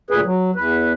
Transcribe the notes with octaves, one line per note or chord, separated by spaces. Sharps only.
D2 A#2 G#4 B4
F#3
E2 B4